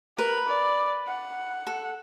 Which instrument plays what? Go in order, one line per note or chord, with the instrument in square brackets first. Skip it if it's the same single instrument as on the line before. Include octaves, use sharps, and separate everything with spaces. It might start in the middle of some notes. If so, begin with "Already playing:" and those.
[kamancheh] A#4 [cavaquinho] B4
[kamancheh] D5
F#5
[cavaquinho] A4